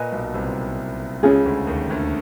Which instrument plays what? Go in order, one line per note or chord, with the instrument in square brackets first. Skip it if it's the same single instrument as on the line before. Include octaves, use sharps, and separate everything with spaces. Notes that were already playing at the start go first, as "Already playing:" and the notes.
Already playing: [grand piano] A#2 [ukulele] B4 D#5 G#5
[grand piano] B1 B2
C2 C3
[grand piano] C#2 C#3 [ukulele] C#4 F4 G#4
[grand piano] D2 D3
D#2 D#3
D2 D3